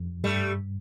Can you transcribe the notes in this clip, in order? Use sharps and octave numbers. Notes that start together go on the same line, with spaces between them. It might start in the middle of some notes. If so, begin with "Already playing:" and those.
Already playing: F2
G2 G3 A3